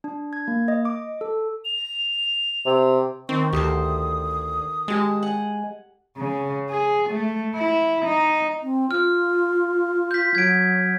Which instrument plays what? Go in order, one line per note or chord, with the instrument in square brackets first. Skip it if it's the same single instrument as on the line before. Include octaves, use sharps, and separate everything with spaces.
[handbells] D4
G#6
A#3
D#5
D6
A4
[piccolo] F7
[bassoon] C3
[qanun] D#3 [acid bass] C4 [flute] C#6
[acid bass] D2 [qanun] G4 A4 C5 [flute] D#6
[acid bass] G#3 [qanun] G4 A5
[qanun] F#5 [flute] G#5
[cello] C#3
G#4
A3
E4
D#4
[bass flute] C4
[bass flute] F4 [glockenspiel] F6
[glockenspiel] G6 B6
[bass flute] F#3 [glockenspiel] G#6 D7